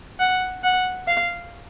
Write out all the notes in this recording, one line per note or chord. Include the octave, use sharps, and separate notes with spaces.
F#5
F#5
F5